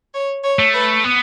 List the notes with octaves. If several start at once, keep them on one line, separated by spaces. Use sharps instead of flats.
C#5
C#5
A3
B4
B3